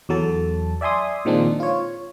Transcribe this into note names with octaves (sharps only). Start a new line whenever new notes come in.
E2 F#3 A4 A5
D5 E5 G#5 C6 D#6
A#2 D#3 F3 G#3 C4 D4
F4 C#5